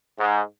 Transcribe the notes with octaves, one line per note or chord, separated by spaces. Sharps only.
G#2